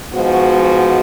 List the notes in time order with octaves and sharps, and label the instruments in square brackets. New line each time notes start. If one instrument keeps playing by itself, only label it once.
[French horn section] G#2 F3 G#3 B3 F#4